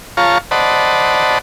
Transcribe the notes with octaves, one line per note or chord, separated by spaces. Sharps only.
F4 C#5 F5 A5 A#5 C#6
C5 D5 D#5 F#5 A5 B5